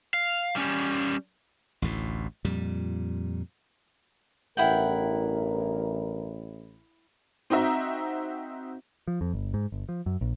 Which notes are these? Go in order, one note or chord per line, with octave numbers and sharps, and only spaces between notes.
F5
G3 C#4
A1 D2 A2
F2 A#2 G3
A1 E2 G2 E4 A#4 F#5 G5
C4 D#4 F#4 E5 A#5
F3
F2
G1
G#2
G1
F3
F#2
A#1